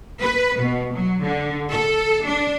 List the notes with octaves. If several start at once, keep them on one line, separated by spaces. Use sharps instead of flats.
B4
B2
F#3
D3
A4
D4